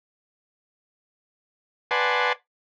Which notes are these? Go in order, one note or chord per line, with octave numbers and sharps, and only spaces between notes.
B4 D5 F#5 G#5 A5 C6